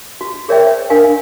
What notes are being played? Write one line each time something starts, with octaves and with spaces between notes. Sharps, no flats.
F#4
G#4 A#4 C#5 D5 E5 G5
C5
D4 A#4 F5 G#5